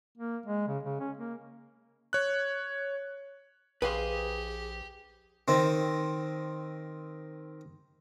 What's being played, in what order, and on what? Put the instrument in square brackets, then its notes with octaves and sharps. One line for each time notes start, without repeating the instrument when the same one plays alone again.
[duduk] A#3
G#3
C#3
C#3
C#4
A#3
[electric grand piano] C#5 F#6
[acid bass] A#1 [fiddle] G4 [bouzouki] G#4 [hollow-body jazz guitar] B4 F5 C6
[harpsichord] D#3 C4